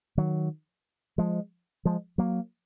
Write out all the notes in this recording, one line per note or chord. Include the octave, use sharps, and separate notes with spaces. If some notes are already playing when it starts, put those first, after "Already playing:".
D#3 F#3
F3 G#3
F3 G#3
F#3 A#3